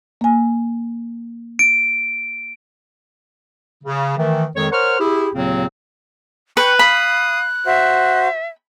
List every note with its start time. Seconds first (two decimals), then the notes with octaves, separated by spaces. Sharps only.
0.21 A#3 G#5
1.59 D7
3.84 C#3
4.17 D#3 E3 A3
4.56 F2 D#3 G#3 C#5
4.71 A#4 C5 C#5 F#5 C#6 F6
4.99 E4 G4 G#4
5.35 D#2 A#2 C#3 F#3 C4
6.57 B4 G5 C#6 F#6
6.79 F5 B5 D#6
7.66 F#4 C5 E5